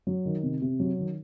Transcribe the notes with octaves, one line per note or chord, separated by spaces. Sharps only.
F#3
D#3
C3
C3
F#3
D#3